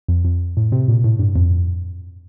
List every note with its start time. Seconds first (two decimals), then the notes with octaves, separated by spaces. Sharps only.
0.08 F2
0.25 F2
0.57 A2
0.72 C3
0.88 A#2
1.04 A2
1.19 G2
1.36 F2